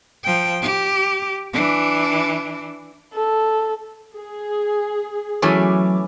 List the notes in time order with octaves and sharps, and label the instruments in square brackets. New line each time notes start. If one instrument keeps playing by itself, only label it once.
[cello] F3 G5
G4
E3 D4
[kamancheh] A4
[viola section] G#4
[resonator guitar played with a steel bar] E3 A3 C#4 [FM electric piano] F#3 D6